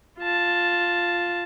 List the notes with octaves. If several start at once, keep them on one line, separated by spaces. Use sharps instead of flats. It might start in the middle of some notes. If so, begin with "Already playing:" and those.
F4 A5